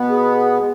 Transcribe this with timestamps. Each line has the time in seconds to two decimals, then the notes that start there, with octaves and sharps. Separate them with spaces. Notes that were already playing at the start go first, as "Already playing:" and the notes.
Already playing: B2 B3
0.09 G#4
0.37 G#4
0.58 G#3